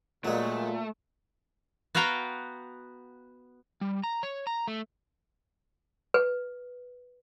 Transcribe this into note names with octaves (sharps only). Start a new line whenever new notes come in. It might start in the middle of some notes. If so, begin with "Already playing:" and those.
A#2 F#3 G#3 A3
B3 F#4 F5 G5 A#5
G3
A#5
C#5
A#5
A3
B4